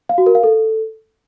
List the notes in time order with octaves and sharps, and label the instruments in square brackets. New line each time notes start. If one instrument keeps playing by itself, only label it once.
[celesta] F5
F#4
A#4
F5
A4